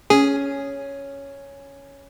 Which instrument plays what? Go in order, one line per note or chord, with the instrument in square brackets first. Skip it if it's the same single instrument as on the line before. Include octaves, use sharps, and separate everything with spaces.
[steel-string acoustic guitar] C#4 [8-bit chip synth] G#4